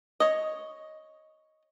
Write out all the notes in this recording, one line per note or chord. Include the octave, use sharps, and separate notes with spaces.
C#5 D#5